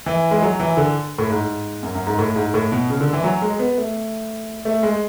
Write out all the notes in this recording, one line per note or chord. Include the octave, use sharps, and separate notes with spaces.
E3
G#3
F#3
E3
D3
A2
G#2
F#2
F#2
G#2
A2
G#2
A2
B2
C#3
D3
E3
F#3
G#3
B3
A3
A3
G#3